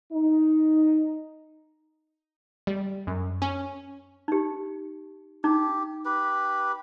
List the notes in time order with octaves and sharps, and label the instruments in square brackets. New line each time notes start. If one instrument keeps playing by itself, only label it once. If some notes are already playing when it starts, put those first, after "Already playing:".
[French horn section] D#4
[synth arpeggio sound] G3
F#2
C#4
[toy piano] D#4 G4
[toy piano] D#4 [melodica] G4
[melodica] G4 B4